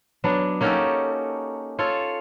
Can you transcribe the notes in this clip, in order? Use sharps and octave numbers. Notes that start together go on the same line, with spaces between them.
F#3 B3 D4
A#3 C#4 D#4 F#4 G4 A4
F4 A4 C#5